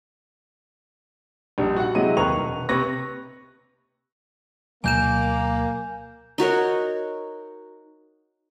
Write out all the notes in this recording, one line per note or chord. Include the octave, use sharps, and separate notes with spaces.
A#1 G3 D#4
F#4 F#5
C3 F#3 G#3 E4 D#5 D#7
D#2 A#4 B4 A#5 C#6 F7
E1
C3 B4 C#6 A#6
D2 B2 F#3 A#3 G#5 G6 E7
D#4 F#4 A#4 C#5